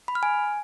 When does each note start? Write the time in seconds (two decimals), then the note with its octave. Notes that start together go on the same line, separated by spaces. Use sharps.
0.08 B5
0.15 F6
0.23 G#5